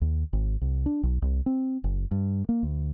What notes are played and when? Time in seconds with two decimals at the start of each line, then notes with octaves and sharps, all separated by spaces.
0.01 D#2
0.33 G#1
0.61 C2
0.86 D4
1.03 B1
1.22 C2
1.46 C4
1.84 F#1
2.11 G2
2.49 A#3
2.63 D2